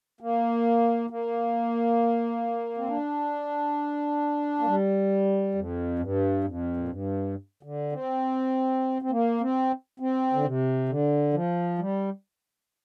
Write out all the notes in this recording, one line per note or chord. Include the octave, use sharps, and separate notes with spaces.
A#3
A#3
C4
D4
A#3
G3
F2
G2
F2
A#2
G2
D3
C4
C4
A#3
C4
C4
D3
C3
D3
F3
G3